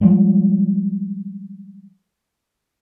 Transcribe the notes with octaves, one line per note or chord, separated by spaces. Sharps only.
F3 G3 G#3